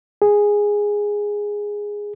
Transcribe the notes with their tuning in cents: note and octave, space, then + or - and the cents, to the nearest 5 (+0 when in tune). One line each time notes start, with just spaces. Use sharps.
G#4 -10